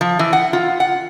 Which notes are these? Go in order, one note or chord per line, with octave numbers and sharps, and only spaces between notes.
F3
E3
F#5
F4
F#5